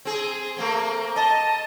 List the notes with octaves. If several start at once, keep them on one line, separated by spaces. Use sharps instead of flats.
C4 G#4
A3 A#3 C4
D#5 A5